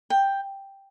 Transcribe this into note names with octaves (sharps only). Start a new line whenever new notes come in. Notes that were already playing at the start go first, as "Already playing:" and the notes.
G5